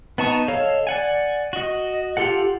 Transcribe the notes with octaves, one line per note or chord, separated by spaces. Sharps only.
B3 D#4 A5 C#6 D#6
A4 C#5 D#5 F5
D5 F#5 G#5
F#4 D#5
F4 G4 A4 F#5